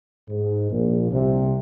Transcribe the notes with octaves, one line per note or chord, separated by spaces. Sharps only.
G#2
A#1 A#2
C2 C3